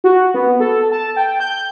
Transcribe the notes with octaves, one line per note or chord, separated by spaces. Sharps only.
F#4
B3
A4
A5
G5
G6